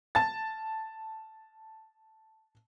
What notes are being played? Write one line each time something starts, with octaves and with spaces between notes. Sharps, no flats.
A5 A6